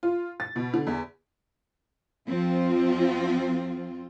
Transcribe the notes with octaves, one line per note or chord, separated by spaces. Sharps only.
F4
A6
B2
D3
E2
F2 F3 C4 F4